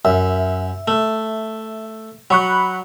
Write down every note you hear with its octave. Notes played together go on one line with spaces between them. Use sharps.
F#2 E5
A3
F#3 B5 C#6 F#6